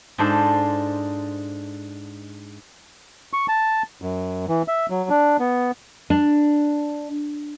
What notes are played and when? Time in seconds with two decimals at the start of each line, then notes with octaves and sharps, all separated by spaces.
0.18 G#2 D4 F4 A4 C5
3.33 C#6
3.48 A5
4.02 F#2
4.48 E3
4.68 E5
4.90 F#3
5.10 D4
5.39 B3
6.10 D4